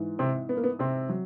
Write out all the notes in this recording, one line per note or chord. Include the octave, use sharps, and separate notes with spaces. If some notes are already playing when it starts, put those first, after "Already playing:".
Already playing: G#2 E3
C3 C4
B3
A#3
B3
C3 C4
F#3